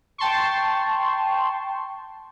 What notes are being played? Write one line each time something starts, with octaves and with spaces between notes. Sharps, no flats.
G5 A5 C6 C#6